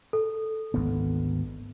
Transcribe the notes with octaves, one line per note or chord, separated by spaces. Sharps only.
A4
G#1 D2 B3